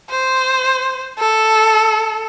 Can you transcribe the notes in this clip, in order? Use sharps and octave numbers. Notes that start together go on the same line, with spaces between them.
C5
A4